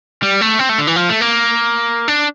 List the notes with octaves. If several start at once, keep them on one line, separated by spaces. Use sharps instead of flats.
G3
A3
C4
A3
D3
E3
F3
A3
A#3
D4